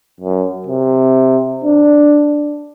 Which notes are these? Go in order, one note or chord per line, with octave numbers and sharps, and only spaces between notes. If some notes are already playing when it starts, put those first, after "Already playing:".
F#2
C3
D4